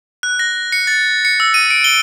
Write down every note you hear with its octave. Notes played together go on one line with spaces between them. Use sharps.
F#6
A#6
C#7
A6
C#7
E6
D#7
D7
G7